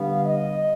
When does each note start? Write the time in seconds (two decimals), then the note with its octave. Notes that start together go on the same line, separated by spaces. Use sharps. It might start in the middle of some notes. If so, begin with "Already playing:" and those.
Already playing: D3 G3 B3 F5
0.25 D#5